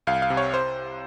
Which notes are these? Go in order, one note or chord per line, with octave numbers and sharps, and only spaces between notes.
C2 F5
F5
C3
C#5
C5